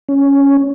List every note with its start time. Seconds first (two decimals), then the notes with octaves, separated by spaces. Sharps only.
0.09 C#4